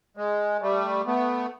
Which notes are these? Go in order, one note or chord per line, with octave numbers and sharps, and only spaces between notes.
G#3
G3 A3
A3 B3